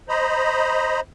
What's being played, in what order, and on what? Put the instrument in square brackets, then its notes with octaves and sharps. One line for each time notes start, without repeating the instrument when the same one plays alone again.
[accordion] C5 D#5 A#5 B5